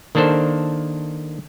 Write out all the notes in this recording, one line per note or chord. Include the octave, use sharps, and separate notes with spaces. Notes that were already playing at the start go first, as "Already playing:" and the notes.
D#3 A#3 D4 A4 C5